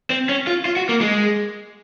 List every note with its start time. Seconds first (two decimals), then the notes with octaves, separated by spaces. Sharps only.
0.10 C4
0.29 C#4
0.47 F4
0.65 F4
0.76 F#4
0.89 A#3
1.01 G#3